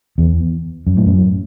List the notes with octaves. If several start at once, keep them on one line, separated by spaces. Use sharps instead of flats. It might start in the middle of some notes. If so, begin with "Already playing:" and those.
E2
F#2
A2
F#2